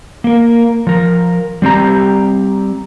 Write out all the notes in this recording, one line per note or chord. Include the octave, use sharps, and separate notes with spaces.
A#3 A#4
F3 A#4
G3 C4 G4 A#5